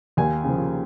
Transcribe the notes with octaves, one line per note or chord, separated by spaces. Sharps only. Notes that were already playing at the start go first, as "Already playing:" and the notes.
D#2 G#5
C#3 F3